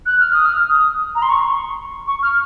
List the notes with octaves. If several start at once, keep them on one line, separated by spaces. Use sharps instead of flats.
F#6
F6
D#6
F6
D#6
A#5
C6
C#6
C#6
F6